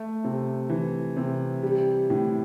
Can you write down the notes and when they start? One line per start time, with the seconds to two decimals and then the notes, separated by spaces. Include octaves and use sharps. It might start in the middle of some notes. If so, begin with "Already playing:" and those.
Already playing: A3
0.24 C3
0.70 E3
1.17 C3
1.63 G3
2.10 A2